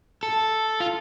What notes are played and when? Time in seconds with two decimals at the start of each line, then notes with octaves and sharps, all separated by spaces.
0.23 A4
0.80 F4